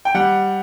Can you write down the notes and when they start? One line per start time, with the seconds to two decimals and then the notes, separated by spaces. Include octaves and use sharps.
0.05 G5
0.15 G3 F#5